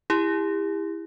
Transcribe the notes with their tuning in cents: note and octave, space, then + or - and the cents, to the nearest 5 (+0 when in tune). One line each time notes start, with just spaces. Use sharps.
E4 +0 G4 +40